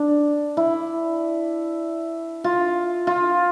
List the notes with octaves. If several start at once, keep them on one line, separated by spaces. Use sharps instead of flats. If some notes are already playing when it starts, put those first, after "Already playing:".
Already playing: D4
E4
F4
F4